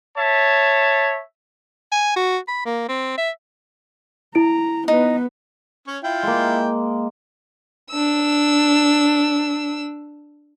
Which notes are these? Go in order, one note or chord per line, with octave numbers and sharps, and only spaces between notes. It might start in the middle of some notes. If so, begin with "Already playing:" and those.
C#5 E5 A5
G#5
F#4
B5
A#3
C4
E5
E4 A#5 D7
B3 D#4 B4
C#4 C#5
E4 F4 G5
G#3 A#3
D4 E6